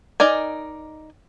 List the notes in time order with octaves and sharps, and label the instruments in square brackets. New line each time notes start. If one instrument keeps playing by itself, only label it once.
[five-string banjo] D#4 A#4 D5 G#5